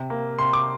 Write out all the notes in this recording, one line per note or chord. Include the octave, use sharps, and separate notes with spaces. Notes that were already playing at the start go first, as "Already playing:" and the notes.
Already playing: C3
A#3
C3 C6
D6